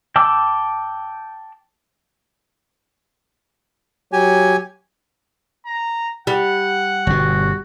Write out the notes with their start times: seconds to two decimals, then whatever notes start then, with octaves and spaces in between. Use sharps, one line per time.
0.16 G5 A5 D6 E6
4.13 F#3 G4 G#5
5.66 A#5
6.27 G3 F#5
7.07 G1 B2 F#4